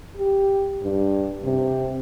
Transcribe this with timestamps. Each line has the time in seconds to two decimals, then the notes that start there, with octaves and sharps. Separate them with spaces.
0.17 G4
0.83 G2
1.45 C3